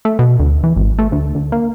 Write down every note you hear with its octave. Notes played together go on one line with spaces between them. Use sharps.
A3
B2
D2
E3
G#1
A3
D2
D2
A#3